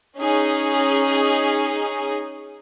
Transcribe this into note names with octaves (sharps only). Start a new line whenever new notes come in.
C#4 D#4 G#4